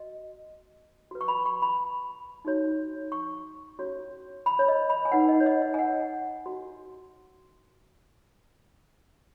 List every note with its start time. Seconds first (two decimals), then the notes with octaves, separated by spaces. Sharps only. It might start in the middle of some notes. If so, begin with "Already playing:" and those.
Already playing: F#4 D#5
1.11 F#4 B4
1.21 C#6
1.28 B5
1.46 C#6
1.62 B5
2.45 D#4 F#4 C#5
3.12 C#6
3.79 C#4 F#4 C#5
4.46 B5
4.59 C#5
4.68 D#5
4.90 B5
5.05 G#5
5.12 D#4 B4 F#5
5.29 D#5
5.40 C#5
5.46 D#5
5.62 D#5
5.74 G#5
5.79 F#5
6.46 F#4